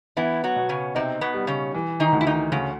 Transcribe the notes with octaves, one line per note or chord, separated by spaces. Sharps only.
E3 B3 E4
F#3 F#4
B2
C#3 C#4
C3 C4 D#4
B2 B3
G3
C#3 C#4
E3
D#3 D#4
D2
E4
D#3 D#4
D2 C#3 C#4